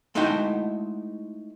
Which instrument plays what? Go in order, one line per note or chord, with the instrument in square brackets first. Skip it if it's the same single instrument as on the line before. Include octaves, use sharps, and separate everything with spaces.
[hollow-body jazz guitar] G#3 A3 D#4 E4 F#4 G5